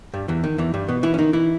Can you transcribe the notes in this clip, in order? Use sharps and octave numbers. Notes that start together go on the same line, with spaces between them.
G2 G3
E2 E3
D#3
E2 E3
G2 G3
B2 B3
E3 E4
C#4
D#3 D#4
E3 E4